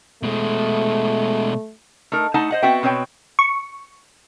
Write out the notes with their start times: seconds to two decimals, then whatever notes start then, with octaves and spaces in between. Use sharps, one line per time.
0.23 B2 G#3 A3
2.12 A3 D#4 A#4
2.34 A3 D#4 F#5 A5
2.50 C5 D#5 F#5
2.63 B3 C4 F#4 E5 G5
2.83 B2 C4 B4 C#5 G5
3.39 C#6